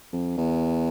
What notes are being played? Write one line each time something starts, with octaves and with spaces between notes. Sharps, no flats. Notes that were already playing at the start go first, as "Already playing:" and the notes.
F2
E2